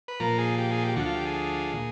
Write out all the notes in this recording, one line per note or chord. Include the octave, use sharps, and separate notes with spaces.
B4
A#2 F3 A#4
G#4
G4
G#4
G4
D2 D3 F3 F#4
F4
G4
G#4
A#2